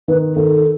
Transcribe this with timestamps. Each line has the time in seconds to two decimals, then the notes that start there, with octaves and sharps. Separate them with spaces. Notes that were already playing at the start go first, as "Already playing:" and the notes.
0.08 D#3 B4
0.36 D#3 A4